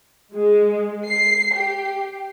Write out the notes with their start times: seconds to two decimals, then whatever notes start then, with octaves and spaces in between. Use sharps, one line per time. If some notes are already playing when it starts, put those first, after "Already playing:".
0.34 G#3
1.07 C7
1.55 G4